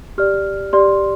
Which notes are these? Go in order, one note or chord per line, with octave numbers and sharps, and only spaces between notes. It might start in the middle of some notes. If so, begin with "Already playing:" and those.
G4 D5 F6
G4 D5 C6